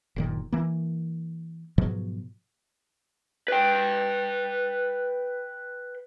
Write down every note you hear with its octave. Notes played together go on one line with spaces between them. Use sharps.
F#1 A#2 D#3
E3 A#3
G#2 B2 F3 F#3
B4 G5